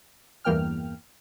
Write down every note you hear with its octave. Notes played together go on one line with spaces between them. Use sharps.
E2 G2 E3 A#3 G5 F6